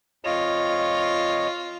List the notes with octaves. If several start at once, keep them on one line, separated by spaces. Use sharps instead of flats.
F2 F4 C#5 D#5